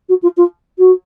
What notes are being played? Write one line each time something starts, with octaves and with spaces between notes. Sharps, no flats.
F#4
F4
F4
F#4